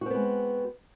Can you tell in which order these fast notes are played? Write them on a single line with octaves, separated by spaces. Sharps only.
F#4 C4 B3 G#3